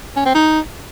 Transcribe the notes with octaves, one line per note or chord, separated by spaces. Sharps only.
C#4
C4
D#4